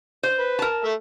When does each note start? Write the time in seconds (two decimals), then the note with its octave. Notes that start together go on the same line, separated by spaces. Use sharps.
0.23 C5
0.39 B4
0.59 A#4 A5
0.84 A3 E5